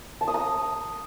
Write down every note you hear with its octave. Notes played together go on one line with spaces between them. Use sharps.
A5
D#6
A#5